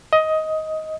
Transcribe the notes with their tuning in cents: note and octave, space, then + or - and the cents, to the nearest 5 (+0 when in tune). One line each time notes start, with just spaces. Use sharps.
D#5 +15